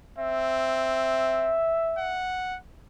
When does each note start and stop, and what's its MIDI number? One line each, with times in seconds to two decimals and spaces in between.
0.18 1.58 60
0.18 2.25 76
1.98 2.57 78